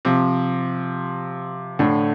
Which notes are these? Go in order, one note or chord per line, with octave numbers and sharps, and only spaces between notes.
C3 F3
A2 D3